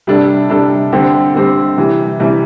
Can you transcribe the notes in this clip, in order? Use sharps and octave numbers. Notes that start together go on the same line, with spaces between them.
C3 G3 D4 A4
C3 G3 D4 A4
D3 G3 C4 G4
D3 G3 C4 G4
C3 E3 G3
C3 E3 G3